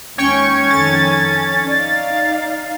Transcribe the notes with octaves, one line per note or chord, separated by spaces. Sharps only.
D#2 G#3 C#4 C#5 G5 C#6 G#6
F2 D#3 A4 A6
D#4 D5 F5